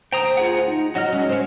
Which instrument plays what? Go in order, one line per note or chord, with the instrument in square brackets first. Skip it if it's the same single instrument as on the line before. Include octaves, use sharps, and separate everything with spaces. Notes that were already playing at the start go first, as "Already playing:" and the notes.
[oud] D2 C5 [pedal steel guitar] G5 A#5 D#6
[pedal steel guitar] F4 G#4 F#5
D#4
[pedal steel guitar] F#3 D#5 F6 [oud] F#4
[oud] G#3 C#4
C4 C#4